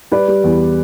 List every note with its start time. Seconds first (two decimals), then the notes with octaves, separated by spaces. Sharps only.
0.12 G3 B4 D5
0.28 G3
0.44 E2